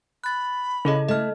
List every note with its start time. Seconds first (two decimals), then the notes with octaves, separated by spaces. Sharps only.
0.24 B5 F#6 A6
0.85 C#3 E4 A4 D#5
1.09 A3 D#5 F6